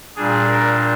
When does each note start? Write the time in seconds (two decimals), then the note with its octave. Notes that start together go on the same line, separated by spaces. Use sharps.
0.16 A#2 G3 D4 G#4
0.47 A#4